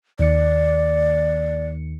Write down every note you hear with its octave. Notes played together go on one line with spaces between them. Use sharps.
D#2 D#3 D5 C#7